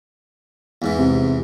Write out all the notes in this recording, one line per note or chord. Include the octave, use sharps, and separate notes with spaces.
E2 G#2 E3
C3